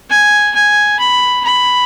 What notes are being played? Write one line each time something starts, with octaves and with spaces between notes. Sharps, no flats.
G#5
G#5
B5
B5